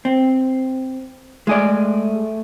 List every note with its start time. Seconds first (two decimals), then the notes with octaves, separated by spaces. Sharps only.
0.05 C4
1.47 G#3 A3 G#4 D5